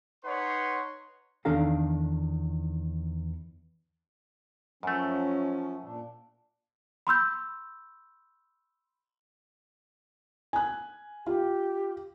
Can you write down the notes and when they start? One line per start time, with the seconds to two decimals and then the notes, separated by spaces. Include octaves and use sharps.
0.25 D#4 B4 C#5 F#5 C6
1.45 E2 D#3 D4 A4 F5 A#5
4.83 F#2 F3 A3 C#4
5.83 A#2 D4
7.07 B5 C6 E6 G6
10.53 G#5 F#6
11.27 F4 G4